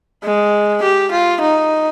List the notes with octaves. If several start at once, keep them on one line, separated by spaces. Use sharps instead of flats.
G#3
G4
F4
D#4